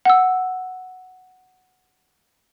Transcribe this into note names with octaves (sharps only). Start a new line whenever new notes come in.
F#5 E6